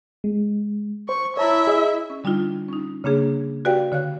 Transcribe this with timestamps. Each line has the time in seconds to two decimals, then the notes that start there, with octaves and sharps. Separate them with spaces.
0.24 G#3
1.09 C5 C#6
1.37 E4 C#5 E5 A5 A#5
1.67 G#4 D#5
2.10 C#4
2.24 D3 G3 D4 D#4 F4
2.69 C#4 D#4
3.04 C#3 A#3 D4 G#4
3.65 F#4 G4 B4 D5 F5 G5
3.92 D3 C#5 F5 F#6